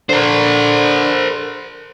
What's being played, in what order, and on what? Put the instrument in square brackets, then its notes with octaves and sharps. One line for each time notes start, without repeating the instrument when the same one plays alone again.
[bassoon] D3 [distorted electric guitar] A#4 C5